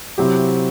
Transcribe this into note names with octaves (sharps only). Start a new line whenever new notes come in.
C3 F#3 C4 E4 G4